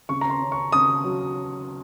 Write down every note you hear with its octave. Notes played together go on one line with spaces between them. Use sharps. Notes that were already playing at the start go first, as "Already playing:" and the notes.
C#3 C#6
A#5
C6
C#4
C#6
C#3 D#6
F#3